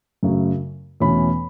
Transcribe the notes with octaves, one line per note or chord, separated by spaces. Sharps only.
F#2 C#3 F#3 A3
E2 B2 A3 C#4 B5